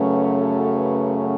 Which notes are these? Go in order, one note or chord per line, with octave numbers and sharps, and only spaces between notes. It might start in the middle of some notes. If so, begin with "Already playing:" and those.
Already playing: F#2 C#3 F#3 A3 C#4 B4
A4
B4